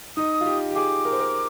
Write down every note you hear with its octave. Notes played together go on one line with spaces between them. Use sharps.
D#4 D#6
F4
G4
G4
G#4 D6
A#4
C5
A#4